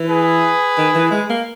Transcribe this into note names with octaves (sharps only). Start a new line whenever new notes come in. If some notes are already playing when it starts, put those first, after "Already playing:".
Already playing: E3
G#4 B4
D#3
E3
G#3
A#3